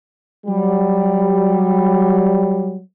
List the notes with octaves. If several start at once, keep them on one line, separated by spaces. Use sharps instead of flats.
F#3 G3